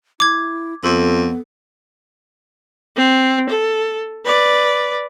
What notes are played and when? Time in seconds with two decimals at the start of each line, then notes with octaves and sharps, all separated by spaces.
0.20 E4 D6 G#6
0.84 F2 B3 A4
2.96 C4
3.49 A4
4.25 B4 D5